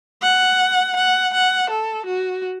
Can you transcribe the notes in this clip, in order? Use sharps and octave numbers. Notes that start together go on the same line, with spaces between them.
F#5
F#5
F#5
A4
F#4